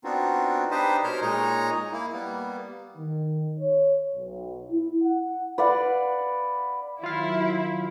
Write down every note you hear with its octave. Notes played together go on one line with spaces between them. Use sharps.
B3 C4 D4 D#4 F4 F#4
D4 D#4 G4 B4 C5 D#5
B2 A#4 C5 C#5 F6 G6
A#2 G#3 D#4 C#5 D#5 A#5
A#3 E4
G3 A#3 B3
D#3
C#5
B1
E4
F#5
B4 D5 F5 F#5
D#3 F#3 E4 F4 F5